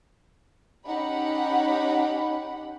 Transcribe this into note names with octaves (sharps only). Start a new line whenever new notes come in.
C#4 D#4 G4 F#5 B5